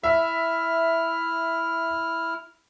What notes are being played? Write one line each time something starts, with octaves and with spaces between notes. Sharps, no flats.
E4 E5 F6